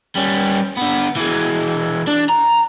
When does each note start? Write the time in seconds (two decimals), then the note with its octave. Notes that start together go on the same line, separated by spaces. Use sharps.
0.15 G3 C#4
0.77 D3 B3
1.17 E3 G#3
2.07 D4
2.29 A#5